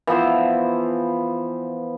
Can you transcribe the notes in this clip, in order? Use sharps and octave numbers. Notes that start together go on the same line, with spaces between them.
E3 F3 B3 C5